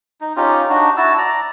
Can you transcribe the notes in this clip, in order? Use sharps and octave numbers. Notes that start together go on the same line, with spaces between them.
D#4
C#4 D#4 F4 G4
D4 D#4 F#4
E4 F#4 A5 E6
D5 A#5